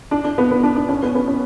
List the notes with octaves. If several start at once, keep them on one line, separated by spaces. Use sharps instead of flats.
D4
D4
B3
B3
D4
D4
C#4
B3
B3
C#4